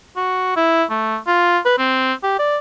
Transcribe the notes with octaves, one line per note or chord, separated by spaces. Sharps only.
F#4
E4
A3
F4
B4
C4
G4
D5